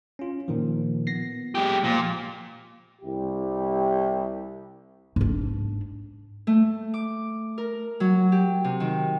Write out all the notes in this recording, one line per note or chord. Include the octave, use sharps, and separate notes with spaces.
C#4 F4
A#2 D#3 F3
B3 A#6 C7
G#3 G4
A#2 F3
C2 E4 G4
G#2 D4
A3
D6
A#4
F#3
G4
C3
D#3